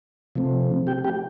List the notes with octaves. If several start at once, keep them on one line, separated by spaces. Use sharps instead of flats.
C3 F3 A3 C4
G4 G5
G4 G5